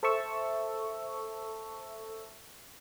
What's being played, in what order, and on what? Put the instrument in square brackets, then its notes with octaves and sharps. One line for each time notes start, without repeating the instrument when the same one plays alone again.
[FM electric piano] A4 C5 E5 A5 C#6 E6